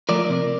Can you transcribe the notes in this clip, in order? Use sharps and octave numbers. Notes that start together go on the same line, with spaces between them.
F3 A3 A#4 D5
C3